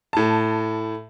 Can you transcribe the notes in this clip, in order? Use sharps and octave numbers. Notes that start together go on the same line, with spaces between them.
A2 A5